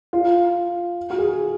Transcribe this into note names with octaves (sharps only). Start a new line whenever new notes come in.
F4
F#4
G#4